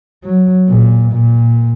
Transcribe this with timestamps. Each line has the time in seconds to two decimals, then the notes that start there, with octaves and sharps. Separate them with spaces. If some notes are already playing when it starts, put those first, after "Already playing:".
0.25 F#3
0.69 A#2
1.13 A#2